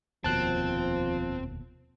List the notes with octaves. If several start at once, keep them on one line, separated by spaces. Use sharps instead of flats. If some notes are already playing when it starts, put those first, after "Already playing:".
F1 D#2 B2 F3 C4 A5 F#6